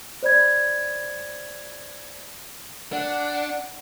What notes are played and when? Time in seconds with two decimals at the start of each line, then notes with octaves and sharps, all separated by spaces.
0.23 C5 D5 B5 G#6
2.93 D4 F#5